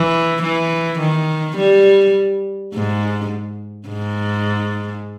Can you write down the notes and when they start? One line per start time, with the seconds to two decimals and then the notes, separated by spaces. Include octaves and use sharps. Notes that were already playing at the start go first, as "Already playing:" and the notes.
Already playing: E3
0.42 E3
0.99 D#3
1.57 G3
2.73 G#2
3.88 G#2